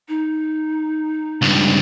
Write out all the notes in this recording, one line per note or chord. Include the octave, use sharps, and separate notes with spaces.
D#4
C#2 G2